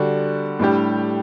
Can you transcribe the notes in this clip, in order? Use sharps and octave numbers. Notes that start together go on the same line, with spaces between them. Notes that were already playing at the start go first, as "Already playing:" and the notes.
Already playing: D3 G3 D4 F#4
A2 G3 D4 G4